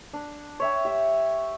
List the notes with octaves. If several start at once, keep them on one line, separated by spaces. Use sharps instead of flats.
D4
C#5 E5 G5
G4 E5